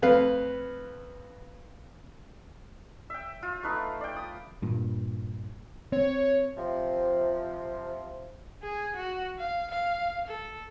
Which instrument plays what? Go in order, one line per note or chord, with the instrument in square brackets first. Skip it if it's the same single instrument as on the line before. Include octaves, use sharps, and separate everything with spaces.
[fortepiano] F2 A3 B4 F5
[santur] E5 G5
F4
A3 D#4 B4 C#6
D5 G5
D#6
[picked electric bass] G2 A#2
[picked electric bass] C4 [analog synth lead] C#5
[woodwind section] C3 F3
[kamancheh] G#4
F#4
F5
F5
A4